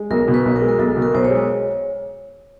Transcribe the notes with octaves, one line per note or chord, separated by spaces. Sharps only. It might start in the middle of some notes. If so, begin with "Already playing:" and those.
Already playing: G#3
B1 A#4
B2
B4
B1
A#4
G#3
A#4
B1 A4
B2
A#4
B1 C5
C#5
G#3